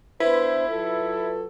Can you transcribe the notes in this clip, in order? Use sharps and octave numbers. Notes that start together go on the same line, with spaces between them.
B3 D4 E4 B4 C5
F#3 F4 A4